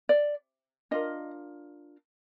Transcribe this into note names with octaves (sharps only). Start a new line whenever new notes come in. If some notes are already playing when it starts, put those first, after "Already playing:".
D5
D4 F4 A#4 D#5